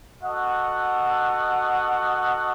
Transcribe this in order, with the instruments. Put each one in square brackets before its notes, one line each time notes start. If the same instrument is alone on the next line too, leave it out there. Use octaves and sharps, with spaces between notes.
[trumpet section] F#4 A4 D#5 F#5